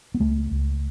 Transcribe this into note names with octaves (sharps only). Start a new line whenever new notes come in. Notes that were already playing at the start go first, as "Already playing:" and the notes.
B3
C#2 A3
C#2